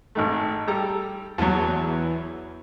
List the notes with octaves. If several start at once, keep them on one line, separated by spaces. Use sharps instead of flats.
G#1 D#3 A3
G3 A4 A#5
E2 F#3 A5